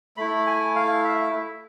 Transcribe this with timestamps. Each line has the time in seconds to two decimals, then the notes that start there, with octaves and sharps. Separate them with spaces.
0.17 A3 E4 B5
0.47 G#5
0.75 F5
1.04 E5